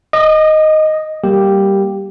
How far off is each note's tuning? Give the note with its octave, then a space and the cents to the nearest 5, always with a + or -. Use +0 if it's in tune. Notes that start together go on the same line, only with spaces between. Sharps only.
D#5 +0 D#6 -45
G3 +0 A#3 +0 G4 +0